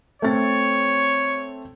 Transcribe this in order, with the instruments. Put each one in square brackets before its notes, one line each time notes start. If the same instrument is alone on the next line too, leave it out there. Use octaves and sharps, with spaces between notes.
[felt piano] A3 C4 A6 [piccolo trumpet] C#5